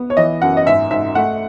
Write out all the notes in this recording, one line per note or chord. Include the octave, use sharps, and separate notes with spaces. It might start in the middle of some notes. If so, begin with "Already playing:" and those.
Already playing: B3
C#5
E3 D#5
F#2 F#5
D#5
G#2 E5
G#2 E5
A3 F#5